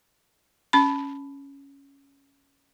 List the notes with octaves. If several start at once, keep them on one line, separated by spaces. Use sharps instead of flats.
C#4 B5